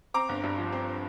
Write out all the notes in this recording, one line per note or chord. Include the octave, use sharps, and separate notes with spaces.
C4 A#5 D6
G1
G2
F3
C4